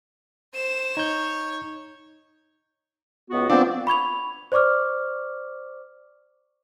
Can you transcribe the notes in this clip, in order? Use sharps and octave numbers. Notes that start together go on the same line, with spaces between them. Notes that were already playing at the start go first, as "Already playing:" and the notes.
C5 E7
D#4 C#5 G6
C#2 B3 F#4
F3 B3 C4 D4
B5 C#6 G#6 F7
C5 D5 C#6 D6 F6